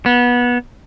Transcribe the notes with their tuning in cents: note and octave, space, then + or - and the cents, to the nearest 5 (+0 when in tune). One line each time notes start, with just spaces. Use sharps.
B3 -20